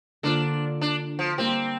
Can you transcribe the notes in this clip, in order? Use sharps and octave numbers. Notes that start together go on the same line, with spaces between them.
D3 A#3 D4 F4 C5
D4
F3
G3 A#3 C4 G4